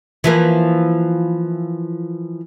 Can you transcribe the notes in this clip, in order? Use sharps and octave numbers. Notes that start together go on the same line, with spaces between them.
E3 F3 A#3